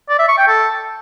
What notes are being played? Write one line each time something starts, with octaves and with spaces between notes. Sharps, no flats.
D5
E5
C#6
G5
A4